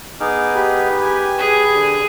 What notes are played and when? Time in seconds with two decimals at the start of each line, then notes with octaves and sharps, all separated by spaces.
0.20 B3 D#4 G#4 D6 F6
0.55 G4 B4
1.02 G#5
1.38 G#4
1.74 D3